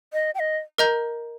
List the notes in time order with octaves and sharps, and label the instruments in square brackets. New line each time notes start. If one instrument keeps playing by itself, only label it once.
[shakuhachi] D#5
G5
D#5
[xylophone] A#4 D#5 A#5 G6